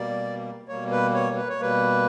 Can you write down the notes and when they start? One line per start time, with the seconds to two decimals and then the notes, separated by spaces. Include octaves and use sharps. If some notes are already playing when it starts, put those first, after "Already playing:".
Already playing: B2 G3 A#3 D5
0.69 B2 G3 A#3 C#5
0.91 B4
1.14 C#5
1.36 B4
1.49 C#5
1.59 B2 G3 A#3 B4